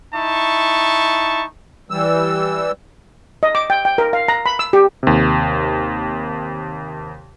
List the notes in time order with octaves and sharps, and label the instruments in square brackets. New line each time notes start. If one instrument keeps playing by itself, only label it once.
[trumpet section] D#4 E4 A5 C#6
[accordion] E3 G3 E6
[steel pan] D#5
D6
G5
G5
A#4
F5
A#5
B5
E6
G4
[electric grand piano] D#2 C3